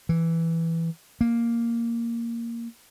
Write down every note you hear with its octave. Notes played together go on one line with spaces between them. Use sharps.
E3
A#3